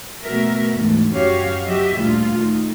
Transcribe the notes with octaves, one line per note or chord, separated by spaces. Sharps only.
B2 A3 F#4 A#4 E5
D2 G#2 E3 A3
F#2 C#4 F#4 G4 C#5 F5
F#3 F#4 G4 D#5 E5
D2 A#2 G3 A#3 F4
D#3 A3